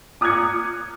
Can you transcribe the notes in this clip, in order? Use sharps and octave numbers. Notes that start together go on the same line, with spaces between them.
D6 D#6 F6 F#6 G#6 C#7